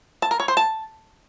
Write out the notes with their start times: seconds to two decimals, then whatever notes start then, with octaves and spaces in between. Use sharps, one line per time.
0.22 A5
0.31 A#4
0.40 C#5
0.48 C5
0.57 A5